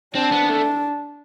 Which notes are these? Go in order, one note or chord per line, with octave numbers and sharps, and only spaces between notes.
C4 D4
B3
A3